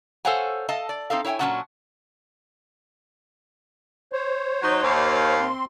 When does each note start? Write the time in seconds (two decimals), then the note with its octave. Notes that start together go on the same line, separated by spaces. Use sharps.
0.25 A4 C5 C#5 F5 F#5 G#5
0.69 A4 D#5 F5 A5
0.89 D5
1.10 C4 D#4 A4 F5
1.25 E4 C#5 F5 G5 G#5
1.39 A#2 F#3 G#3 C#4 F#5 A5
4.12 C5 C#5
4.62 F#3 D#4
4.82 D#2 F5
5.41 C4 C6